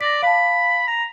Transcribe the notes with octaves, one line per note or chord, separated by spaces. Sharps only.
D5 A#6 B6
F5 A5 B5
A#5